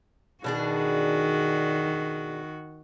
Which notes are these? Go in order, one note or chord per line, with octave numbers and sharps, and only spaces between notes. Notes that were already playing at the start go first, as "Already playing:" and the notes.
B2 D#3 D4 F#4 G#4